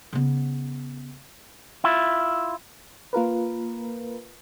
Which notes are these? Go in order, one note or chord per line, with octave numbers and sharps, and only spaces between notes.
C#3 B3
E4 F4
A#3 F4 A#4 B4